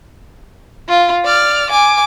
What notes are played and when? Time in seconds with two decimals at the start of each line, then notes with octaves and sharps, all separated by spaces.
0.88 F4
1.25 D5 F6
1.70 G#5 D6